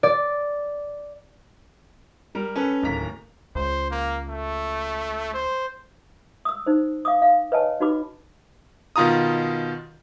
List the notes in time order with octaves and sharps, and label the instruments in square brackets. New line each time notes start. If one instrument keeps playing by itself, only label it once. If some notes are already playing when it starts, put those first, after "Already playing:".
[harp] D5
[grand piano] G3 A#4
C#4 A4 B4
D1 D#2 A#3 A#5 B6
[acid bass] C#2 [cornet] C5
[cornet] A#3
A3
C5
[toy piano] D#6 E6
D#4 C5
F5 D6 D#6
F5
B4 C#5 D#5 G#5 A5
D#4 F#4 B4 B5 D6
[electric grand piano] B2 D#3 F4 A#5 D#6